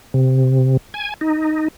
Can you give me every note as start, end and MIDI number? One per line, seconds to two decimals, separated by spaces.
0.14 0.77 48
0.94 1.14 80
1.21 1.68 63